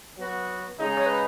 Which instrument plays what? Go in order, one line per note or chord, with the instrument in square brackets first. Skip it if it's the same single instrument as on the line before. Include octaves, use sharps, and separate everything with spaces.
[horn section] F#3 B3 F#4
C#3 G#3 D#4 G#4
[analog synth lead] C#5
B4